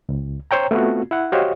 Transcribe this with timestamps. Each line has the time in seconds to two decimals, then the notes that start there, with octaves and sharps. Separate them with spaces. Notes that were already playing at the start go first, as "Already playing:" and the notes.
0.09 C#2
0.51 C5 C#5 G5 A#5
0.71 A3 B3 C4 F4 F#4
1.11 E4 F#5
1.32 F#4 G4 C5 C#5 D#5 F5